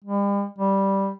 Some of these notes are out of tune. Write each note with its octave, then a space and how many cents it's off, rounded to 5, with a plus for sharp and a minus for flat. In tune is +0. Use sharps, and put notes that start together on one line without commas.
G3 +40
G3 -5